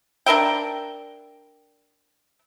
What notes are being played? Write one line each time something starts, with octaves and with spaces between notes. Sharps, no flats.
D4 A#4 E5 G5